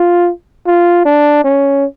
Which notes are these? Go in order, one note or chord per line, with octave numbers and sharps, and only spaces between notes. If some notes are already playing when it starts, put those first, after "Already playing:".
Already playing: F4
F4
D4
C#4